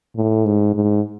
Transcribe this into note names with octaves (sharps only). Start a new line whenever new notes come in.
A2
G#2
G#2